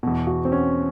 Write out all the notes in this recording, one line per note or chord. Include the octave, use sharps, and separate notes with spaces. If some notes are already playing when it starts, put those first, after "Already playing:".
E2 B2
F#4
C4
C#4